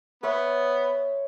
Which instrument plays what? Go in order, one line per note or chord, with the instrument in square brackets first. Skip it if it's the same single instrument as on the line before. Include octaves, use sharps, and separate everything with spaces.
[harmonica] B3 [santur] C#5 E5